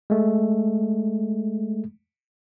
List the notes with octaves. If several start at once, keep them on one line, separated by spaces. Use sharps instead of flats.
G#3 A3